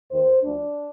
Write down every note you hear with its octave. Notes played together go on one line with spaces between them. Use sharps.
D#2 D#3 C5
D2 D3 F3 D4